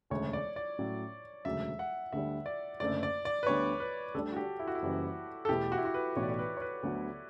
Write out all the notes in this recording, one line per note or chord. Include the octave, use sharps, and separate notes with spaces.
E1 D2 C#3 C#5
D5
D5
A2 F#3 C#4
E1 D2 C#3 F#3 E5
F#5
D2 D3 G3 E5
D5
F#1 F#2 D3 A3 D4 D5
D5
D5
B4
D2 D3 G3 B3 D4 C#5
B4
D2 D3 G3 D4 A4
F#4
G4
E4
F#4
E4
F#1 F#2 E3 G3
A4
E2 B2 A3 E4 G4
F#4
E4
F#4
B4
B1 A2 E3 B3 F#4 C#5
D5
C#5
B4
C#5
B4
D2 D3 F#3 B3 F#4